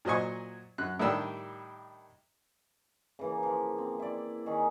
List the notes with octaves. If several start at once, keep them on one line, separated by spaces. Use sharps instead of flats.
A#2 F#3 C5 D#5 G#5 C#6
F#2 F#6
A2 D#3 G3 D4 G4 E6
C#3 E3 A#3
F3
C4
E4 D5
D#3 C#4 G#4